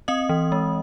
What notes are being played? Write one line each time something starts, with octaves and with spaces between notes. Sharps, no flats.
C4 D#5 D#6
E3
G#3